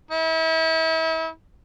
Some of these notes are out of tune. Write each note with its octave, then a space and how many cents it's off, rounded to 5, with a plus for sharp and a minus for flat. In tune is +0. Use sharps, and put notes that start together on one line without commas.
E4 -35